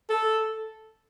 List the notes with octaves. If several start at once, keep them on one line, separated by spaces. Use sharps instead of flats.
A4